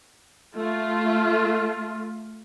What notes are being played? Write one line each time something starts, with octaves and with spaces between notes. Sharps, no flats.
A3 F4